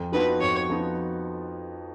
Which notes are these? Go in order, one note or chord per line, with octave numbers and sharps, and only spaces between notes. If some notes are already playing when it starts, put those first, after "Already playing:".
Already playing: F2
F3 B3 D#4 F#4 B4
F2 C#5
F3 B3 D#4 F#4